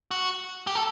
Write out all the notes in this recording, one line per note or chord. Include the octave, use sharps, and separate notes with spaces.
F#4
G4
A4